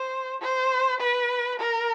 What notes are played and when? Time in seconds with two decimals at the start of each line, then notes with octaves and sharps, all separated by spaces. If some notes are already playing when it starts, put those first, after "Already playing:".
Already playing: C5
0.41 C5
1.00 B4
1.59 A#4